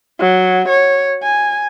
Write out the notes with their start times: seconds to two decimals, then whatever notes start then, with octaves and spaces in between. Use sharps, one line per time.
0.19 F#3
0.68 C#5
1.23 G#5